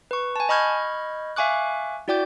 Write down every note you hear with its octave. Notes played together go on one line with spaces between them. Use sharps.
B4 C#6
G#5 A5
D#5 B5 C#6 F6 G6 G#6
E5 F5 G#5 C#6 D6 F#6
E4 F#4 D5 G5 D6 G6